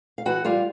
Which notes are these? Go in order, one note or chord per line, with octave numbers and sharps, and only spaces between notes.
F5
E3 F#4 F#5
G3 F4 F5